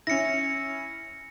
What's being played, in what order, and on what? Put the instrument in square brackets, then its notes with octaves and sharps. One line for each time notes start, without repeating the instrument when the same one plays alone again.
[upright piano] C#4 E4 [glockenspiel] A#6 C#7